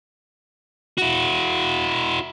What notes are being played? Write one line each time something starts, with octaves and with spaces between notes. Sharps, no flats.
E4 F#4